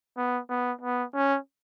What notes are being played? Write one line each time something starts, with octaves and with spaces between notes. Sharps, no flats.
B3
B3
B3
C#4